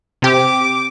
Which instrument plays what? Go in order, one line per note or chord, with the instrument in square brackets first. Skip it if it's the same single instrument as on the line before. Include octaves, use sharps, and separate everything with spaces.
[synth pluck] C3 G4 [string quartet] D6